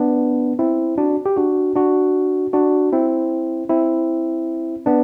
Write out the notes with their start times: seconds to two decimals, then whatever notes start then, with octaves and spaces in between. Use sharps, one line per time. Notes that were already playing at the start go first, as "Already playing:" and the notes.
Already playing: B3 D4
0.59 C4 E4
0.98 D4 F#4
1.26 G4
1.37 D4 F#4
1.75 D4 F#4
2.53 D4 F#4
2.93 C4 E4
3.70 C4 E4
4.86 B3 D4